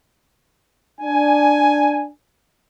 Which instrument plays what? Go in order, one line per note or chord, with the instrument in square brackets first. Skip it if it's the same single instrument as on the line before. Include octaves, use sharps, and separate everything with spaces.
[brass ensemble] D4 G#5